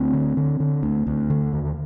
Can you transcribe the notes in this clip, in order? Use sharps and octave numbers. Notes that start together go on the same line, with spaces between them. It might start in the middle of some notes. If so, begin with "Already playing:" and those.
Already playing: D2 C4
D3
D3
D3
D2
D2
D3
D#2